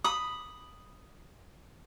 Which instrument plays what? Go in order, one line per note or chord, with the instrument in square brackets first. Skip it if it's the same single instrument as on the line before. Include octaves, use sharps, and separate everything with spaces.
[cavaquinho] B5 D#6